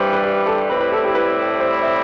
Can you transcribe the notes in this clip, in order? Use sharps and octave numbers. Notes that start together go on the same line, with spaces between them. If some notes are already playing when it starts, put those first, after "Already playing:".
Already playing: G2 E3 G3 C5
B4
G4
A4
A2 G3 C4 E4 B4
B4
A4
G4
B4
C5
E5